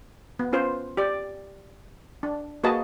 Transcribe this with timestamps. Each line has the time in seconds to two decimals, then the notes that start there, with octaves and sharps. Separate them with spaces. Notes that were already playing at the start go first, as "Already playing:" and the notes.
0.39 B3
0.53 C#4 F4 B4 C5
0.97 G4 D5
2.23 D4
2.64 A#3 F#4 G#4 B4 D#5 A5